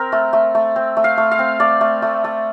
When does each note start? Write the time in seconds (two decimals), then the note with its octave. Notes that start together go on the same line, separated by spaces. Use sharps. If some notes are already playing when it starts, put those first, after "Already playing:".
Already playing: C4 A#4
0.12 A3
0.33 A3
0.55 A3
0.76 C4
0.97 A3
1.04 F5
1.17 A3
1.31 F5
1.39 C4
1.60 A3 D5
1.81 A3
2.02 A3
2.24 A3